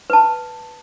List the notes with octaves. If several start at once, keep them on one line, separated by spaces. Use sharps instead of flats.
B4 A5